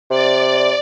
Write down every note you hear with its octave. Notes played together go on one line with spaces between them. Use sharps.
C3 D5